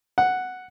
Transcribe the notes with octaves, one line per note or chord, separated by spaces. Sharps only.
F#5